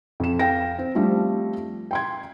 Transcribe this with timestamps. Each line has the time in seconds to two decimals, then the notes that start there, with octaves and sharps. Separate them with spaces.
0.20 F2 E7
0.39 F5 G5 A#6
0.79 C4
0.95 F3 G3 A3 C4 D4 F4
1.91 G5 C6 G#6